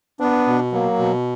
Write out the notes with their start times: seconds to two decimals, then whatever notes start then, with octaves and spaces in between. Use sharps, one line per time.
0.20 B3 D4
0.47 B2
0.72 F#3 A#3
0.99 B2